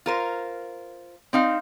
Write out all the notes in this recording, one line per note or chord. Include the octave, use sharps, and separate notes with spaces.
F4 A#4 C5
C4 D#4 F5